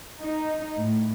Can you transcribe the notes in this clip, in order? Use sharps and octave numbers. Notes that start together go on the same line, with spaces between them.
D#4
A2